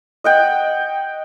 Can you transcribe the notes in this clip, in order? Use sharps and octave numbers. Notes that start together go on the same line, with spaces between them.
D#5 F#5 G5